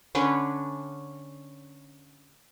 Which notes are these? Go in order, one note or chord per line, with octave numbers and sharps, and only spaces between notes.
D3 C#4 D4 B4